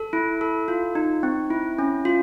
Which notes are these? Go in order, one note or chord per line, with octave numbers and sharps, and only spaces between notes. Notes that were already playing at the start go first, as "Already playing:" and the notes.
Already playing: A4
E4
A4
F4
D#4
C4
E4
C#4
F4